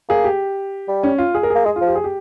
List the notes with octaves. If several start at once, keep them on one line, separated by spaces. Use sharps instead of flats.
A#3 G#4
G4
G3
C#4
F4
G#4
A#4
G#4
A#3
G#3 G#4
F4
F3
G4
G#4
G4